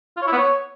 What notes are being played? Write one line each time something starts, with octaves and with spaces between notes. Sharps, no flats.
F4
C#5
E4
B3
C#5